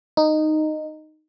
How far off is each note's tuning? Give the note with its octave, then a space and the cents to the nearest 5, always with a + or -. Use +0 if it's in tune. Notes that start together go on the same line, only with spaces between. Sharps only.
D#4 -10